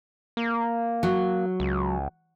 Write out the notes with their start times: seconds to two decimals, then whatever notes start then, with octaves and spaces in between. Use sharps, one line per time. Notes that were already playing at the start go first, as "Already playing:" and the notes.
0.37 A#3
1.03 F#3
1.60 C#2